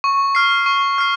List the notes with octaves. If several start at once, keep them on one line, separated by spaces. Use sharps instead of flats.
C#6
F6 C7
C#6
F6 C7